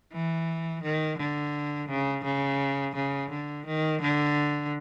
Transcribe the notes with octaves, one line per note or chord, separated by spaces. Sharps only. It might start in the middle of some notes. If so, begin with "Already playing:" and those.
E3
D#3
D3
C#3
C#3
C#3
D3
D#3
D3